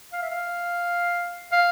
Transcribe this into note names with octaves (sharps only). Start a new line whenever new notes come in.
F5
E5
F5
F5